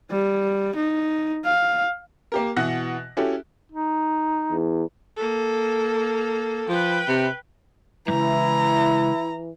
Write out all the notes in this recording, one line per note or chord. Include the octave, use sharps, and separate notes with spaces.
G3
D#4
F5
A#3 G4 A#4
B2 E3 F#5 F#6 A#6
C#4 E4 F#4 G4 A4
D#4
E2
A#3 A4
F3 B4 G5
C3
C#2 G2 E3 E4 A#5